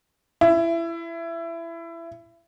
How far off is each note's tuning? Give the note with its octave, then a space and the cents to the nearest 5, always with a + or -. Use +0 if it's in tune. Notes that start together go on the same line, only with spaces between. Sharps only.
E4 +20